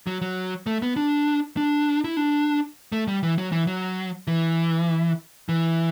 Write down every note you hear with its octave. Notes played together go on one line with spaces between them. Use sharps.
F#3
F#3
A3
B3
D4
D4
E4
D4
A3
G3
E3
F#3
E3
F#3
E3
E3